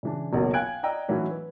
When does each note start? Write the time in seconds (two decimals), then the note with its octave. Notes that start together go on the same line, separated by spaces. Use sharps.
0.03 C#3 E3 D4
0.33 F#1 B1 F#3 A#3 D#5
0.54 F5 G5 G#5 F#6 G#6 D7
0.83 D5 D#5 G5 A#5 E6
1.08 A2 E3 F#3 C#4 D#4
1.31 B4